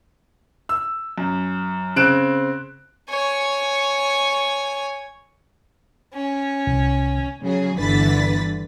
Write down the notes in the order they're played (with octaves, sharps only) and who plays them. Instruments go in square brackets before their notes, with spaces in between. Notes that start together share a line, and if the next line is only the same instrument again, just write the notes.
[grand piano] E6
F#2
C#3 C4 F#6 D7 E7
[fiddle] C#5 G#5
C#4
[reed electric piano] C2
[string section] C#3 F#3 G#4
G1 D3 E3 B4 A6 B6